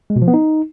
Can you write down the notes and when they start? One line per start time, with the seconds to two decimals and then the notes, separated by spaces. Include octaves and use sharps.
0.10 G#3
0.16 B2
0.22 F3
0.28 B3
0.34 D#4